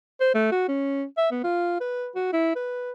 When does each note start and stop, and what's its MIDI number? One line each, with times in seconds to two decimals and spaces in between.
0.20 0.33 72
0.35 0.48 57
0.52 0.66 66
0.69 1.05 61
1.18 1.29 76
1.32 1.41 59
1.44 1.76 65
1.81 2.11 71
2.16 2.32 66
2.33 2.54 64
2.56 2.92 71